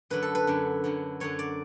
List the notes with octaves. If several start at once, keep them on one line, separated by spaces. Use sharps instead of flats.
F#2 D3 F#3 B4
A4
B4
F#2 D3 F#3
F#2 D3 F#3
F#2 D3 F#3 C#5
D5